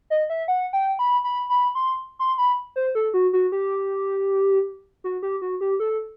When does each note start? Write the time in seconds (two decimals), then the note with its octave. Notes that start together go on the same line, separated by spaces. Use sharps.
0.10 D#5
0.30 E5
0.48 F#5
0.73 G5
0.99 B5
1.24 B5
1.50 B5
1.75 C6
2.19 C6
2.38 B5
2.76 C5
2.95 A4
3.14 F#4
3.33 F#4
3.52 G4
5.04 F#4
5.23 G4
5.42 F#4
5.61 G4
5.80 A4